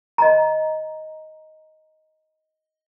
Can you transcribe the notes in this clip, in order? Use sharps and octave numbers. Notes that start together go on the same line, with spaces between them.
D#5 A#5